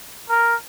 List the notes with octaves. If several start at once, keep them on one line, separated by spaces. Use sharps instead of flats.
A#4